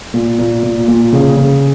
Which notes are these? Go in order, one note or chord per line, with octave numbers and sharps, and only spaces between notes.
A#2
A#2
A#2
A#2
C#3
C#3